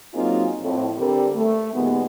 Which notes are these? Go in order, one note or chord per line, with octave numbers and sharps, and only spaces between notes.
F#3 A#3 C4 D#4 F4 G#4
F2 A2
D3 G3 C4 A4 A#4
A3
A#2 D#3 G3 G#3 B3